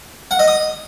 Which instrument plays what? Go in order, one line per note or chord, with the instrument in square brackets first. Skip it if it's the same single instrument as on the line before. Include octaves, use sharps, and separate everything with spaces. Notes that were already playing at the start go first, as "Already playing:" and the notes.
[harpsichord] F#5
D#5
D#6